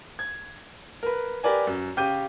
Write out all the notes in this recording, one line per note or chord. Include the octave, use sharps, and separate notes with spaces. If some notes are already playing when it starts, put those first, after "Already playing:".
G#6
A#4 B4
G4 A#4 B4 D5 G#5 A#5
F#2
C#3 G4 G5 D6 G6 D#7